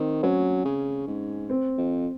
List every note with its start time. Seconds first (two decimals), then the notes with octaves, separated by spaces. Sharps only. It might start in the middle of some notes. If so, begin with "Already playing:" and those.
Already playing: D#3 C4
0.23 F#3 C#4
0.65 C#3
1.08 G#2
1.50 C4
1.78 F2